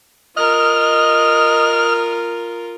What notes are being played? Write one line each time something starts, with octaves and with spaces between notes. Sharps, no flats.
F4 A#4 D#5 F6